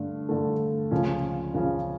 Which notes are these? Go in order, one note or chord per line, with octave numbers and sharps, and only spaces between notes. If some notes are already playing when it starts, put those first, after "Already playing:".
Already playing: G2 D3 A3
G2 D3 A3
C#2 C#3 F3 C#4
C#2 C#3 F3 C#4